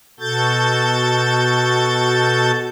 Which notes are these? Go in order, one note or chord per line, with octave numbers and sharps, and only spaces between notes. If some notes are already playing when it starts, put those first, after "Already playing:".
B2 F#4 A4 G6 A6